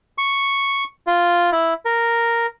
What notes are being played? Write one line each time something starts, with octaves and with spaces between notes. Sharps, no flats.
C#6
F4
E4
A#4